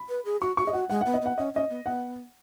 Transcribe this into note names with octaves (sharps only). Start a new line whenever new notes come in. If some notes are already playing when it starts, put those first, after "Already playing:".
Already playing: B5
B4
G#4
F#4 C#6
F#4 C#6
G#4 D#5
F#4 F#5
G#3 F#5
B3 F#5
D#5
B3 F#5
C#4 D#5
C#4 D#5
B3
B3 F#5